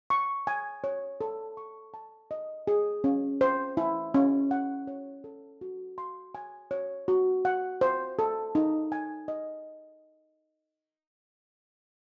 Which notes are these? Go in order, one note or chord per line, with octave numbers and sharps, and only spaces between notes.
C#6
G#5
C#5
A4
C#6
A5
D#5
G#4
C#4
C5
E4
C#4
F#5
C#5
A4
F#4
C6
G#5
C#5
F#4
F#5
C5
A4
D#4
G#5
D#5